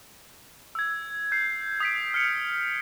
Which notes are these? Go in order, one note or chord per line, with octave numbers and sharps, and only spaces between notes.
E6 G#6
G6 C7
D#6 B6 D7
F6 C#7